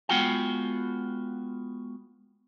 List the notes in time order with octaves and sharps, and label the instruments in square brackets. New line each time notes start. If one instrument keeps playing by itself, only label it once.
[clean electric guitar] G#3 B3 F4 F#4 F#5 G5